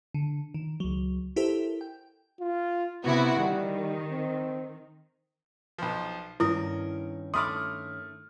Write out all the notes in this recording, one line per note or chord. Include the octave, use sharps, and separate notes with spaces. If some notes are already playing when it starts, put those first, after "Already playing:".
D3
D#3
C#2 F#3
E4 G4 A4 A#4 C5 E5
G5
F4
C3 B3 E4 F#4
D#3 G3
C4
B1 F3
G2 D#3 C#4 E4 A#4 D#6
A3 B5 C6 D6 D#6 F6